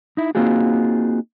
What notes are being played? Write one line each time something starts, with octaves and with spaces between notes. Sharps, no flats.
D#4 E4
A#3 C4 D#4 F4 F#4 G#4